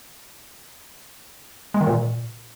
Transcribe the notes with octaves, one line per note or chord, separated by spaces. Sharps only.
G#3
D#3
A#2